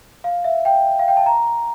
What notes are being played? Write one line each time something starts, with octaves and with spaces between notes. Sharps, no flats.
F5
E5
G5
F5
G5
A5
A#5